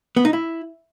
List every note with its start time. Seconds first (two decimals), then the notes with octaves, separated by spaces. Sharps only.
0.17 B3
0.25 D#4
0.33 E4